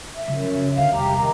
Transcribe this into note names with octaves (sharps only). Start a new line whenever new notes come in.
E5
F#2 C#3 F3
D3 E5 F5
E1 C2 G4 A#5
D#3 A#5